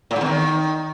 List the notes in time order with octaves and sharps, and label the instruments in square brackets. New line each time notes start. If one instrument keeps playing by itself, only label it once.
[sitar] A2
G#2
E2
D#3